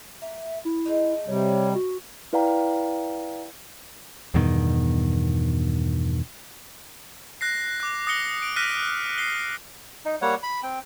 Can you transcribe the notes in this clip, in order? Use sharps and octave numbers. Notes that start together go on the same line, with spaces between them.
A#3 E5
E4
G#3 A3 D#4
C3 G3 C#5
F#4
E4 B4 D5 F5 G5 A#5
E2 G2 B2 D#3
F#6 A#6 C7
D6 F#6
D#6 A#6 C#7 G7
D7
F6 F#6 A#6 B6 D#7
C7 G7
D#4
G3 A#3 C#5 F#5
B5
C4 G5